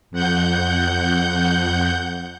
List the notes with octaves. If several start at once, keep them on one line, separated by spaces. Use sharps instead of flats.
F2 F#5 G6